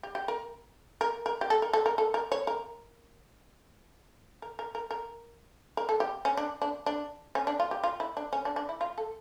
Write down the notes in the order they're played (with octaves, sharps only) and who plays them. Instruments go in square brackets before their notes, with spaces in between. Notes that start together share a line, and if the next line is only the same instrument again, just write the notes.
[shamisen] G4
G4
A#4
A#4
A#4
G4
A4
A#4
A4
A#4
A4
A#4
C#5
A#4
A#4
A#4
A#4
A#4
A#4
A4
G4
C#4
D4
D4
D4
C#4
D4
F4
G4
F4
E4
D4
C#4
D4
D4
E4
F4
A4